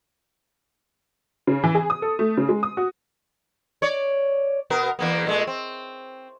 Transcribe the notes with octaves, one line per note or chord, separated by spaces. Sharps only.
C#3
E3
G#4
D#6
A4
A3
C#3
G#3
D#6
F#4
C#5 D5
B2 B3 A#4
E2 A#3 B3
A#2 G#3 A3
C4